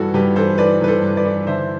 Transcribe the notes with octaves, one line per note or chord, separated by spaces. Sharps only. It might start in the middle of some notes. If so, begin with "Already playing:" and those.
Already playing: G2 E3 F#4 A4
G2 G4 B4
E3 A4 C5
E3 B4 D5
G2 B4
A4 C5
G2
B4 D5
E3
D3 C5 E5